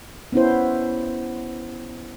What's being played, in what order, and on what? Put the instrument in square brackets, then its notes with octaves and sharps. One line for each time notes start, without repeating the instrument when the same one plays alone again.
[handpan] B3 C#4 E4 C5